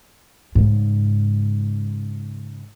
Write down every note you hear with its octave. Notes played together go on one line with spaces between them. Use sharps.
G#2 C#3